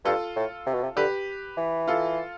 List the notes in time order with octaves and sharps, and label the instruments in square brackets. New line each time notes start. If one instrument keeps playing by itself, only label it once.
[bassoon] G2 [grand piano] F4 A4
[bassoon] A2
C3
B2
C3
[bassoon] D3 [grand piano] G4 B4
[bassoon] E3
[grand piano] F4 A4